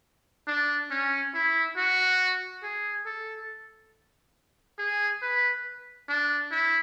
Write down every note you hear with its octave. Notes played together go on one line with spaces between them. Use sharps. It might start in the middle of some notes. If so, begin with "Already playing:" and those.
D4
C#4
E4
F#4
G#4
A4
G#4
B4
D4
E4